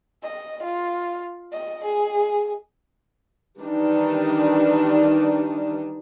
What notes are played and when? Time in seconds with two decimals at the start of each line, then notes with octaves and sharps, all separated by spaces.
0.23 D#5
0.62 F4
1.52 D#5
1.84 G#4
3.59 D#3 E3 G3 D4 D#4